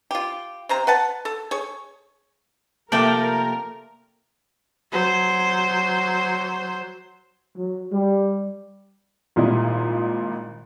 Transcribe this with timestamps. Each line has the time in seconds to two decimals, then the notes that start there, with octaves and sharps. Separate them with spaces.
0.11 F4 G4
0.69 C3 C5 A#5
0.87 B4 F#5 A5
1.25 A4
1.51 G#4 C#5
2.92 C3 F3 A3 A#3 A#4 D5 G5 A5
4.92 F#3 C5
7.57 F#3
7.91 G3
9.36 G#1 A#2 G3 E4 D#5